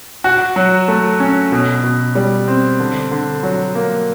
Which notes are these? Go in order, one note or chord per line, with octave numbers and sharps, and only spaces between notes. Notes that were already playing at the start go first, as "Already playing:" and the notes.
F#4
F#3
A3
C#4
B2
B2
G3
C4
D3
D3
F#3
A#3